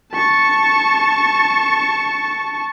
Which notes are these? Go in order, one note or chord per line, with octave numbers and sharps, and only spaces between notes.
A5 C#6